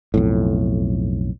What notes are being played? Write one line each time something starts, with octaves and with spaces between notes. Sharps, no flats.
B1 F2 A2